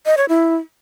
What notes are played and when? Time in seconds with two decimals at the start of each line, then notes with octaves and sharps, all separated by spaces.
0.06 D#5
0.17 C#5
0.29 E4